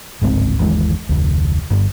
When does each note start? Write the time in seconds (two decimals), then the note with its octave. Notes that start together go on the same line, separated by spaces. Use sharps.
0.22 G1 C#2 G#2 C4
0.59 G1 D#2 E3 G#3
1.09 F1 D2
1.71 G1 G2 G3